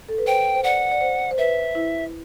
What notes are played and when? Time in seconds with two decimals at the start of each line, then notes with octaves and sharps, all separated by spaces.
0.08 A4
0.18 B4
0.26 C5 G5
0.55 C5
0.64 D5 F#5
0.91 D5
1.01 C5
1.31 C5
1.38 B4 E5
1.75 E4